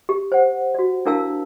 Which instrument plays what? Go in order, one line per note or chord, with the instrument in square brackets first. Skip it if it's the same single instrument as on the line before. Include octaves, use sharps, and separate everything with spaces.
[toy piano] G4
C5 F#5
F#4 D5
D4 E4 A#4 F5 A5 E6